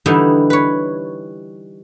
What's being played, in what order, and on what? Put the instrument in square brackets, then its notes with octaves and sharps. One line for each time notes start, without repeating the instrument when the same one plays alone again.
[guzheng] D3 E3 G3 D#4 E4 G4
B4 C#5